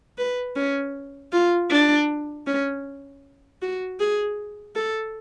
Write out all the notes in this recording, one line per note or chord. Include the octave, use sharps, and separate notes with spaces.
B4
C#4
F4
D4
C#4
F#4
G#4
A4